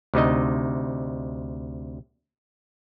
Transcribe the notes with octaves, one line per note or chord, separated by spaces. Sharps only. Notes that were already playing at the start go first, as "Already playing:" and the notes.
D2 C3 D#4 D#5